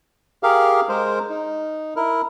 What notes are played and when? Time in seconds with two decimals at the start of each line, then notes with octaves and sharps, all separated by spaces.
0.43 G4 G#4 A#4 F5
0.89 G#3 A#4 C5
1.29 D#4
1.96 E4 A#4